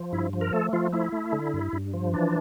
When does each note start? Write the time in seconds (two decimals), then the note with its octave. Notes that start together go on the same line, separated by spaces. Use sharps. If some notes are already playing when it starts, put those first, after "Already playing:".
Already playing: F3
0.13 G2 E4
0.33 F3
0.41 A#4
0.53 A3 A4
0.73 F3 F4
0.93 A3 E4
1.12 A3
1.33 D3
1.54 G2
1.73 G2
1.94 F3
2.13 E3 D4